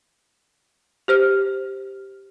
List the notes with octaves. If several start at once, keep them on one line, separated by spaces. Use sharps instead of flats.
G4 C5 F6